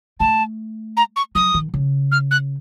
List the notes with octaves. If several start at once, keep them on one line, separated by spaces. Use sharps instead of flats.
A3 A5
A#5
C#6
F#3 D#6
D#3
C#3
F6
F#6